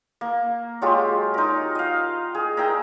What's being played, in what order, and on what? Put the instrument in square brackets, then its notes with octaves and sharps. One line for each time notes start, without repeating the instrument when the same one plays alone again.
[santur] A#3
F#3 G#3 F4 G4
D#4 A#4
D#5 F5
G#4
A#4 E5 G5 A#5